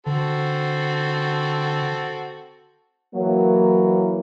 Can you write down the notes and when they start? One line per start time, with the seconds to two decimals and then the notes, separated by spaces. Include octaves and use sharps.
0.06 D3 C4 F#4 A4
3.15 E3 F#3 A#3